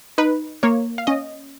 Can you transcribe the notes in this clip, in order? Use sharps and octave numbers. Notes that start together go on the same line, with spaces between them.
D#4 B4
A#3 C#5
F5
C#4 D#5